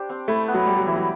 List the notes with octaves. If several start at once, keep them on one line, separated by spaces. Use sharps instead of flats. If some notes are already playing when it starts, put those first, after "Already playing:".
Already playing: D4 G4 C5
C4
A3 E4
B3
F#3
G3 G4
F#3
E3 E4
F#3